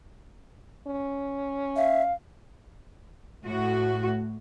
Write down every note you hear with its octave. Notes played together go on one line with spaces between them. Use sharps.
C#4
E5 F5
A2 F#4